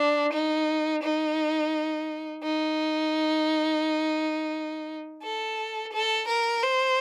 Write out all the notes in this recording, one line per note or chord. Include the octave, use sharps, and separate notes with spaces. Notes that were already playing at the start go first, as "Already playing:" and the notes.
Already playing: D4
D#4
D#4
D#4
A4
A4
A#4
C5